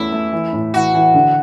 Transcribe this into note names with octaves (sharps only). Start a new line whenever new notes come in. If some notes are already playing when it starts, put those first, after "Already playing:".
Already playing: E2 A3 C#4 E4
A3
E3
A2
E3 F#4
E3
D3